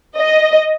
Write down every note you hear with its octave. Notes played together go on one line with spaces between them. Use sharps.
D#5